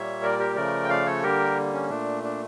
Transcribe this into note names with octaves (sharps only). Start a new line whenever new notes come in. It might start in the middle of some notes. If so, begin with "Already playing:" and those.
Already playing: A#2 G3 A#3 C#5 E5
A#4 D5
G4 A#4
C#3 F3 A3 A#4 D5
G5
D5 F5
A4 C#5
D3 G3 A#3 G4 A#4
C#4
A#2 A3 D4
D4